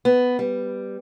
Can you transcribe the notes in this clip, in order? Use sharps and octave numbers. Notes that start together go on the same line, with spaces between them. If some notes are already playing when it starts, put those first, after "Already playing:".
B3
G3